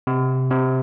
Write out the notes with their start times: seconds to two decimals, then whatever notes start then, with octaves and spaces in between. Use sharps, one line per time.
0.07 C3
0.51 C3